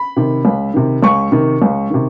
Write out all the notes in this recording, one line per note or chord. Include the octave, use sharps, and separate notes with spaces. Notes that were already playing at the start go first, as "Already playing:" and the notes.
Already playing: B5
C3 D#3
C#2
C3 D#3
C#2 C#6
C3 D#3
C#2
C3 D#3